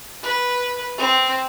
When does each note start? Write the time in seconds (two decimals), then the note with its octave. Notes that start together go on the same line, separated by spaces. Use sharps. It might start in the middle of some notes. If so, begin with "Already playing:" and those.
0.23 B4
0.98 C4